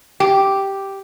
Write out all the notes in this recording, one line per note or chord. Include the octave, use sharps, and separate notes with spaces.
G4